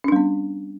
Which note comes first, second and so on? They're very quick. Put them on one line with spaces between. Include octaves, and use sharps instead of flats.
C#4 D4 G3 B3